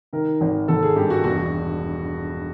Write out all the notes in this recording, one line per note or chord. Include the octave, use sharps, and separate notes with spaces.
D#3 A#4
G#1
G#1 A4
G#4
G2 G4
F#4
E1 F#4